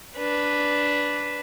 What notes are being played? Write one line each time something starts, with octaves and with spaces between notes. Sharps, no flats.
D4 B4